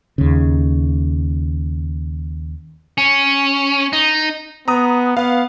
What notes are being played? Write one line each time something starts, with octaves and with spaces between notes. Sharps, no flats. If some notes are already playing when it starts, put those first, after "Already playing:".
D#2 C#3
C#4
D#4
B3 A#5 D#6
B3 F5